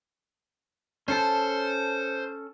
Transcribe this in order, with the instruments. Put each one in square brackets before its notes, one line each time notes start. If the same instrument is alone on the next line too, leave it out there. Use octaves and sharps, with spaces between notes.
[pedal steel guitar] C#4 A4 A5 [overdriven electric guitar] C5